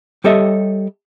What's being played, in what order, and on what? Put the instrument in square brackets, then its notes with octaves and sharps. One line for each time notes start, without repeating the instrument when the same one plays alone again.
[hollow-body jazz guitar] G3 G4 A4 C#5 D#5 E5